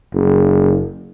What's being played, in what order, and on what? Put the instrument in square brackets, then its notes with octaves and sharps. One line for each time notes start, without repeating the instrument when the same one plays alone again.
[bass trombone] F#1